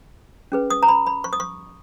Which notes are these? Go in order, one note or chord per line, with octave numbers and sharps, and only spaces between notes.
C#4 G#4 B4
D#6
A#5
B5
B5
C#6
D#6
C#6